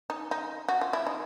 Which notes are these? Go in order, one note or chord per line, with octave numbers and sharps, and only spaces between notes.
D#4
D#4
F#4
F4
E4
D#4